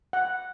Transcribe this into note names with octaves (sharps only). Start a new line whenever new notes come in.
F#5